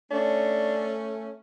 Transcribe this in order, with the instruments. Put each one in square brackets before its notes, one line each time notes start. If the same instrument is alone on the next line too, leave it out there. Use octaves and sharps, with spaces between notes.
[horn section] A3 C#4 [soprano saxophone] D4